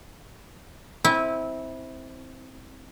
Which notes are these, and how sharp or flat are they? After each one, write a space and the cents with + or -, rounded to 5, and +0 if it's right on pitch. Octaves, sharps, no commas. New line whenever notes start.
C4 +5 E4 -20 G#5 +0